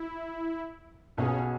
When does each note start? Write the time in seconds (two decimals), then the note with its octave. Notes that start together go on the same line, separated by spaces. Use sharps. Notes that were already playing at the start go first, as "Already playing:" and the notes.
Already playing: E4
1.17 B1 B2 B3 C#4 G#4